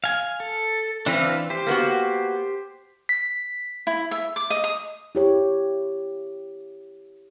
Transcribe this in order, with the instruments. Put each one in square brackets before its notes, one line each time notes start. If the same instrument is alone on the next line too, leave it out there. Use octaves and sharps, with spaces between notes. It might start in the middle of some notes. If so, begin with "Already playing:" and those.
[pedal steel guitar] F5 G#5
A4
[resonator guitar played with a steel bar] E3 C4 [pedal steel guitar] D4 B4 F5
[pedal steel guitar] G4 C5
[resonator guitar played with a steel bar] A#3 B3 F#4
[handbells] B6
[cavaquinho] E4
E5
D6
D#5
D#6
[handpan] E4 G4 C#5